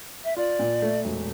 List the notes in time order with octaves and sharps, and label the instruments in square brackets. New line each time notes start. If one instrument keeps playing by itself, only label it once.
[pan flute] E5
[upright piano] F4 [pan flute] D5
[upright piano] A#2
A3
E1